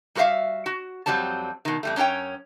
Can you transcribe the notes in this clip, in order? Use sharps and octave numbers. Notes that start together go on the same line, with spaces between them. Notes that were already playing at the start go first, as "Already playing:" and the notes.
G3 F#4 A4 C5 E5 F5
F#4
F2 F#3 G3 C4 A5
B2 D#3
F2 G3 A3
F#2 C#4 D4 C#5 G5